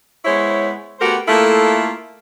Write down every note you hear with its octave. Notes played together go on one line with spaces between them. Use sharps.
G#3 B3 E4 C5 C#5
A3 B3 F#4 G4 A#4 C5
A3 A#3 E4 F4 A4